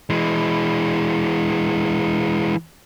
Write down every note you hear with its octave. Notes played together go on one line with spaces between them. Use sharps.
E3 G#3